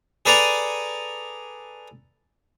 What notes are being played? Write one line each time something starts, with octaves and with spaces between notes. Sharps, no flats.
G#4 A4 B4 D5 G#5 A#5